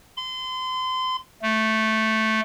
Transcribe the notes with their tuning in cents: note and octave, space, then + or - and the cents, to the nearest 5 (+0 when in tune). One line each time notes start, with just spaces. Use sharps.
C6 -30
A3 -5